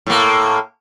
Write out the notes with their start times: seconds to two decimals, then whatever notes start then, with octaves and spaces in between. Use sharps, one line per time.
0.06 A2 A#3